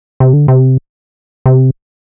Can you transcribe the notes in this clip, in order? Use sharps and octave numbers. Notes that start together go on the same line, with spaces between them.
C3
D3
C3
C3